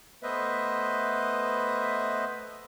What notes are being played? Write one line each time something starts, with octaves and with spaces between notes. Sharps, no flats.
A3 B3 B4 C5 D#5 E5